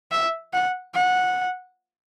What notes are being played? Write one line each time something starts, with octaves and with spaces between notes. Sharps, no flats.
E5
F#5
F#5